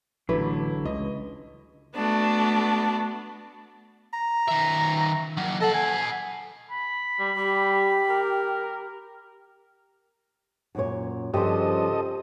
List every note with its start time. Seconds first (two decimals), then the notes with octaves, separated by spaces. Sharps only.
0.29 A1 D3 F#3 E4 B4
0.85 C#2 D#5
1.95 A3 B3 D4 F#4
4.13 A#5
4.48 D#3 E5
5.38 F#3 A#3
5.61 A4 D#5 F#5
5.74 G#5
6.71 B5
7.19 G3
7.36 G3 G4
8.09 A#4
10.75 F#2 A#2 C#5
11.34 G2 C#3 F3 G4 A4 C5 D#5